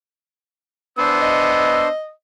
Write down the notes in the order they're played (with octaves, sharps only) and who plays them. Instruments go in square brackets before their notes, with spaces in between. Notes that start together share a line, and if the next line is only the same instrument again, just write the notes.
[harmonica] B3 E6 [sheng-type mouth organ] D4 C5
[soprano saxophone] D#5